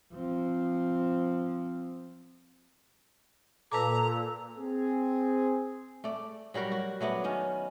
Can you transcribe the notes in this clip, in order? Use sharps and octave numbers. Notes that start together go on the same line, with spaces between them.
F3 C4
A#2 A4 B4 A5 A#5 D6
C4 G#4
A3 D5
F#3 G3 F#4 A#4
F#4
F#3 A3 B3 D4
D#3 C#4